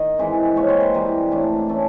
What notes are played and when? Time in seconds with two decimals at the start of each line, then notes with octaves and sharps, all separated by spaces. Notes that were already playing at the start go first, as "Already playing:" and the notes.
Already playing: D#3 D#5
0.18 E3 G#3 C4
0.56 A#2 F3 G#3 C4 C#5
0.69 C5
0.81 B4
0.94 C3 E3 G3 C4 A#4
1.31 A2 E3 A3 D4
1.69 E3 A3 C#4 A4